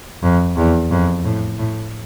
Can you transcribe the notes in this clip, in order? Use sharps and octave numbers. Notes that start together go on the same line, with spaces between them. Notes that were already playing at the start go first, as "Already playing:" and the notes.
F2
E2
F2
A2
A2